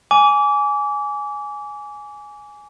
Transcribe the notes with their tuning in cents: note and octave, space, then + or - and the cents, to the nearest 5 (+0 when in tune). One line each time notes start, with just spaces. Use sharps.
G#5 +0 D6 -30